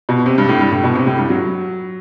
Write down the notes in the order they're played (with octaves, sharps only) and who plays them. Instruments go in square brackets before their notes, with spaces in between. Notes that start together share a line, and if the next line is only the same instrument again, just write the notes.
[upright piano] B2
C3
G2
A2
G2
A2
B2
C3
A2
G2
F#3